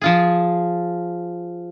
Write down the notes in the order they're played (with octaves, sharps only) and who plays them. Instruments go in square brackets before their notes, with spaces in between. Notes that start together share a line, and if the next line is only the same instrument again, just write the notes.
[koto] F3 F4 G#4